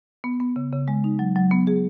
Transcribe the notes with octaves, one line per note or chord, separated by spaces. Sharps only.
B3
B3
C#3
C#3
G#3
D#4
F#3
F#3
B3
G#4